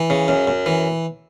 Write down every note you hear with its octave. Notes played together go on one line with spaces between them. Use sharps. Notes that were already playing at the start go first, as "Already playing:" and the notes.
Already playing: E3
C#3
F#2
F#2
E3